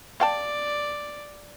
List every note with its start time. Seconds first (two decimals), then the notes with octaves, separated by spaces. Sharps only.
0.20 D5 F5 G5 A5